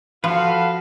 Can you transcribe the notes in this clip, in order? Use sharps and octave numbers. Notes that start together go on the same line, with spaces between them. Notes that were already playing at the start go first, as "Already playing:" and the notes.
F3 F#4 A4 B4 F5